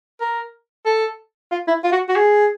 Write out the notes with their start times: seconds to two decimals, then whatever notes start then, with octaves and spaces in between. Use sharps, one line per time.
0.21 A#4
0.86 A4
1.51 F4
1.68 E4
1.84 F4
1.92 F#4
2.09 F#4
2.16 G#4